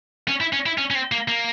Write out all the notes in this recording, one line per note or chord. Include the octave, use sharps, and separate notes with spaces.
C#4
E4
C#4
E4
C#4
C#4
C4
A#3
A#3